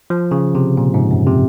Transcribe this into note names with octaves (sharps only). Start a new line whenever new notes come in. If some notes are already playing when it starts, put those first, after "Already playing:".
F3
C#3
C3
A#2
G#2
F#2
C3